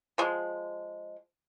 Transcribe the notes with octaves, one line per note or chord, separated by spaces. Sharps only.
F3 G#3